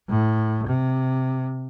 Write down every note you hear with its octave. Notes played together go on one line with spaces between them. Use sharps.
A2
C3